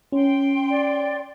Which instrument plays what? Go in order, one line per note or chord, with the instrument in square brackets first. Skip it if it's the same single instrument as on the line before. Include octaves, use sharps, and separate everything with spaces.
[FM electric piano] C#4 [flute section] G5 C6
[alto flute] D5